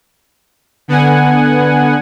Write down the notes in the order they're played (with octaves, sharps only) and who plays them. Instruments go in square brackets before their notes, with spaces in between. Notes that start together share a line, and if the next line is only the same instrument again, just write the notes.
[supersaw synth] D3 B3 F#5 G#5